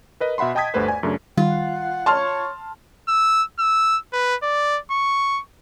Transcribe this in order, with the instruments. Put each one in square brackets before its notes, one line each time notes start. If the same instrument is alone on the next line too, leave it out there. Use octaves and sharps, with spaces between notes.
[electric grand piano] A#4 B4 D#5
B2 E5 F#5 B5 C6
D#5 G5 A5 D#6 G#6 B6
G1 D2 G2 A3 B4 C5
D5 G#5
F#2 C#3 A3 D4
[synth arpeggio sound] D#3 G3 [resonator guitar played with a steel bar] F4 [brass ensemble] F#5
[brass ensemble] C#5 [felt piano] A5 C6 F6
[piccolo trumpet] E6
E6
B4
D5
C#6